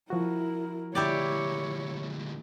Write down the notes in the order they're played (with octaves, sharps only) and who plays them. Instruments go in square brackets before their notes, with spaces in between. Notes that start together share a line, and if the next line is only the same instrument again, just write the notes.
[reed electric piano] F3 F#4 [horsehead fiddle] E4 A#4
[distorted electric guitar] D2 A#2 [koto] E4 G4 D5 [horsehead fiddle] C#5